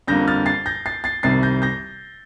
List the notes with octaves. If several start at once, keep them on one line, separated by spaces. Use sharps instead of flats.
F2 D3 G3 A#3 G6 A#6
F6 A6
A6 C7
G6 A#6
A6 C7
A6 C7
C2 C3 D#3 G3 A6 C7
G6 A#6
G6 A#6